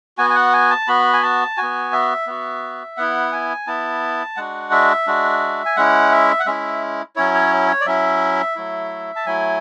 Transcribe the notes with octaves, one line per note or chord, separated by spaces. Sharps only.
B3 F#4 G#5
G#5
F#5
G#5
A5
B3 F#4 B5
G#5
A5
B3 F#4 G#5
E5
B3 F#4
B3 E4 F#5
G#5
B3 E4 A5
G#3 D4 F#4 F#5
E5
G#3 D4 F#4
G#5
G#3 C#4 E4 F#5
E5
F#5
G#3 C#4 E4 E5
F#3 C#4 E4 C#5
C#5
C#5
D5
F#3 C#4 E4 E5
F#3 A3 E4
A5
F#3 A3 E4 G#5